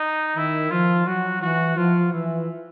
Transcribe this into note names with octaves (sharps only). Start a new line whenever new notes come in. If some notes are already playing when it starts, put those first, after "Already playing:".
Already playing: D#4
D#3 E4
F3 F4
F#3 F#4
E3 F#4
F3 F4
E3 E4